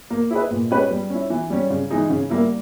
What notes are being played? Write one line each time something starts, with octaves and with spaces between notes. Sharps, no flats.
A#3
E4 G#4 B4
A#2
G#3 C#4 G4 B4
G3
C#4 E4
E3
G3 C#4
C#3
E3 G#3 D#4 G#4
C#3
G3 A#3 E4